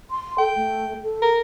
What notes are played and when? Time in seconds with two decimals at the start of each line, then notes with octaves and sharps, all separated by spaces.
0.11 C6
0.39 A4 G5
0.56 A3
1.03 A4
1.22 A#4